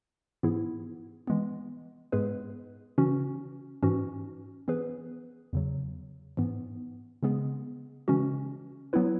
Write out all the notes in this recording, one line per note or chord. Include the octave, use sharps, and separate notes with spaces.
G#2 E3 B3 E4 G#4
E3 G#3 B3
G#2 G#3 B3 G#4 B4
C#3 E3 C#4 F#4
G#2 E3 C#4 F#4
E3 B3 G#4 B4
E2 C#3 F#3
G#2 E3 B3
C#3 G#3 B3 G#4
C#3 E3 G#3 C#4 F#4
F#3 B3 E4 B4